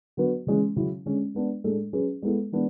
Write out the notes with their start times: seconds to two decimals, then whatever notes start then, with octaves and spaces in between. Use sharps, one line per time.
0.17 D3 F#3 B3 F#4 B4
0.47 C#3 E3 G#3 C#4
0.76 C#3 F#3 C#4 E4
1.06 D3 G#3 C#4
1.35 G#3 B3 D4
1.64 A2 G#3 D4 A4
1.93 F#3 C#4 G#4 B4
2.22 G#3 B3 E4 A4
2.52 E3 G#3 B3 D4